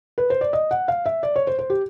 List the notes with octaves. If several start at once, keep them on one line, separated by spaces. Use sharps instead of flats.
B4
C5
D5
D#5
F#5
F5
E5
D5
C#5
C5
C5
G4